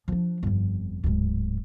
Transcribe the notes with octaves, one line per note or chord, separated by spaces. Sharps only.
F3 D4
G1 F2
D1 G#2